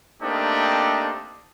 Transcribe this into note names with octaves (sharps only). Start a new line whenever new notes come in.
A3 A#3 C4 D4 D#4 G4